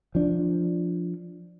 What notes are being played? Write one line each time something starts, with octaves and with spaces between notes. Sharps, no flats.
F3 D4